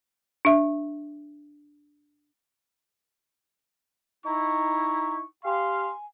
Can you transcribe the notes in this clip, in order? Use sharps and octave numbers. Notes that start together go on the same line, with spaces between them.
D4 E5
D#4 E4 A#5 C#6
G4 F5 G#5 C6